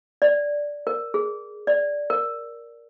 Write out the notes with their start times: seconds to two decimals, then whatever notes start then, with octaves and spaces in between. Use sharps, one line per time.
0.22 D5
0.87 A#4
1.14 G#4
1.67 D5
2.10 A#4